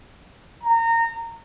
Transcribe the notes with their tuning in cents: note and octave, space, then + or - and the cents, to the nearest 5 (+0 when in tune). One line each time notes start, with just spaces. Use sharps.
A#5 -25